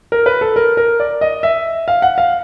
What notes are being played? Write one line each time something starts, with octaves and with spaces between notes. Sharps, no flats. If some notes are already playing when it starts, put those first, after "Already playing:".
A#4
B4
A4
A#4
A#4
D5
D#5
E5
F5
F#5
F5